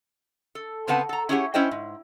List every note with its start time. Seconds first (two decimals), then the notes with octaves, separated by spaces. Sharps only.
0.55 A4
0.87 C#3 B3 C4 B4 F#5 A5
1.09 A4 A#5
1.29 C#4 E4 G4 G#4 C#5 F#5
1.54 C#4 E4 C5 D#5 G5
1.71 G#2